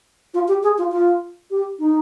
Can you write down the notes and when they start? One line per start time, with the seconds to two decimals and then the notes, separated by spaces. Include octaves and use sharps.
0.34 F4
0.48 G4
0.63 G#4
0.78 F4
0.92 F4
1.50 G4
1.79 D#4